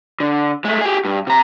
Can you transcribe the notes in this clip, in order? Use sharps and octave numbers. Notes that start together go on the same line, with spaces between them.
D3
G#3 A3
G4 G#4
G2
C3 A#5